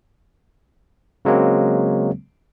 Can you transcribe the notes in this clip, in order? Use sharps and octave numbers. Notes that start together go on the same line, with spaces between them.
C#3 F#3 G#3 A#3 C4